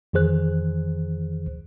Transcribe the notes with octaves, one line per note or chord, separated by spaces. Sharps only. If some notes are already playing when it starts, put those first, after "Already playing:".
F2 D#3 E3 G#4 C5 F#6